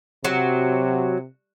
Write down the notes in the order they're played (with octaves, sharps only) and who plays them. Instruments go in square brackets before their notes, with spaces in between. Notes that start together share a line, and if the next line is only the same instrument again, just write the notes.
[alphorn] C3 [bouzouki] F#3